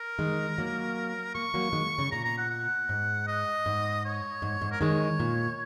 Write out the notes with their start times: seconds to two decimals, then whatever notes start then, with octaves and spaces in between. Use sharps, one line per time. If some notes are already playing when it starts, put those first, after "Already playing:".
Already playing: A#4
0.19 D#3 G#3
0.58 F#3 A#3
1.34 A#3 C#6
1.54 F#3 A#3
1.73 D#3 G#3
1.98 C#3
2.12 A#2 A#5
2.25 A#5
2.38 F#5
2.50 F#5
2.89 G#2
3.27 D#5
3.66 G#2
4.05 C#5
4.42 G#2
4.61 G#2
4.72 A#4
4.81 D#3 G#3 C#5
5.20 A#2